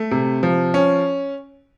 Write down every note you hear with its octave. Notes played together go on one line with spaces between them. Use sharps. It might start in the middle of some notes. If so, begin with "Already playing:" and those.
Already playing: A3
C3
F3
C#4